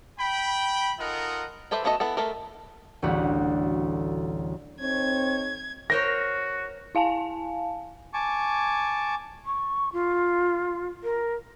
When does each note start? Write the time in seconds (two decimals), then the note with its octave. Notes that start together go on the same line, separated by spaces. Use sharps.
0.19 G5 B5
0.99 D#4 F4 A4 A#4 D#5 F#5
1.71 G4 A4 B4 C5 E5
1.84 A3 B3 F#4 A4 D#5
2.00 B3 E4 A4
2.17 A3 A4 A#4
3.02 A1 D2 G3 F#4
4.81 C4 D#4 A4 C#5 G#6
5.90 F#4 A#4 C5 C#5 A#6
6.95 E4 F5 G#5 A5
8.14 G#5 A5 C#6 D6
9.46 C#6
9.93 F4
11.04 A#4